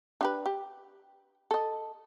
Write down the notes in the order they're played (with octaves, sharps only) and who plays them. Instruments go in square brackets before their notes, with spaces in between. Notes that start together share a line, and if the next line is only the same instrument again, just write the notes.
[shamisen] D4 G4 B4
G4
A4 D#5